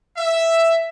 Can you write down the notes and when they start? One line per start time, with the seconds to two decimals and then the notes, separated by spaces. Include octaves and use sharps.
0.17 E5